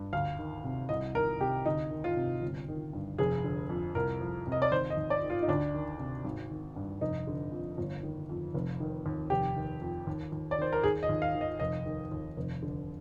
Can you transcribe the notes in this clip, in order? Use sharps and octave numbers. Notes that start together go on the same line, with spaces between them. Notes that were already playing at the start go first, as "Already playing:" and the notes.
Already playing: G2
D2 F5
D#3
C3
C2 D#5
D#3 A#4
C3 G4
D2 D#4
D#3
F4
C3
G1
D#3
G2
F1 G#4
D3
F2
C2 A#4
F3
C3
D#5
D5
D#2 C5
D#5
D#2
D5
D#3
F4
D#4
D2 D4
D#3
C3
G#1
D#3
G2
F1 D#4
D3
F2
G1
D#3
F2
F1
D#3
D#2
F1 G4
D#3
F2
D#2
D#2
D5
D#3 C5
A#4
D#2 G#4
D#5
D#2
F5
D#3
D#5
F1 D#5
D#3
D#2
F1
D3